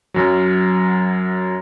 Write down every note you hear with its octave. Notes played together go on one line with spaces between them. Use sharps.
F#2 F#3